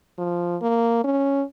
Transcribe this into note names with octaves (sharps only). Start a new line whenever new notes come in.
F3
A#3
C#4